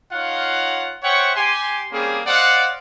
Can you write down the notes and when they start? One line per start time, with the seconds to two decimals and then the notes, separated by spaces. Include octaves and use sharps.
0.12 D#4 F4 C#5 F5 F#5
1.03 C5 C#5 E5 F#5 G5 C#6
1.36 G4 G#5 C6
1.92 G3 A#3 C4 C#4 G#4
2.27 C5 D5 D#5 F5 F#5